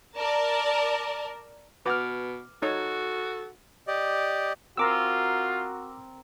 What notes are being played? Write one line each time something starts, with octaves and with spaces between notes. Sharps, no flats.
A#4 D5 A5
B2 B4 F#5 D6 F6
D#4 F#4 A4 C#5
G4 D5 D#5
C4 F4 F#4 A#4 A#5 D6 E6